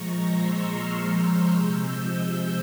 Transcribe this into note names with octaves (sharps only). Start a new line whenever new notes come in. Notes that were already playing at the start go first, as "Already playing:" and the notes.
Already playing: A#2 F3 G#3 A#5 C#6
C6 E6
C#6 F6
E6 G6
C3 F3 G#3 E6 G6